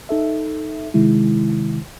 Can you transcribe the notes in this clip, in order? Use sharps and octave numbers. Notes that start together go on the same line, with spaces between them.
D#4 A4 E5
C3 D#3 G#3 E4